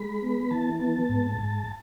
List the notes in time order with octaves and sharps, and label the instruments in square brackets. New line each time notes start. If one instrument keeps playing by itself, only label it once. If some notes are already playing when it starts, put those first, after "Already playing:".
Already playing: [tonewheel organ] G#3 B5
B3
E3 A5
B3 A5
G#2
G#2